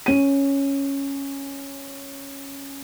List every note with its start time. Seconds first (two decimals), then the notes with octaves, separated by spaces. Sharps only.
0.06 C#4 D#7